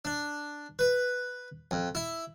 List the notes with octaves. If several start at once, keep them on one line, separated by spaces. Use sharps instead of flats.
D4
B4
F2
E4